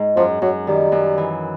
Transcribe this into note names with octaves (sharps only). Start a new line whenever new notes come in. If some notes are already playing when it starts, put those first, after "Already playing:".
Already playing: G#2
F#2 F3
F#2 F#3
D#3 G3
F#2
E3